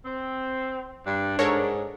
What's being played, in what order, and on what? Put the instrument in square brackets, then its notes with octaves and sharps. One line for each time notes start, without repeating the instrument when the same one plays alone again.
[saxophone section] C4
[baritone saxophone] G2 [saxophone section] D4
[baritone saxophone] G#2 [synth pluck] A4 A#4 C#5